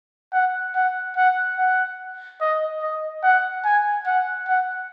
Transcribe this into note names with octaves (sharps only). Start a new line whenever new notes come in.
F#5
F#5
F#5
F#5
D#5
D#5
F#5
G#5
F#5
F#5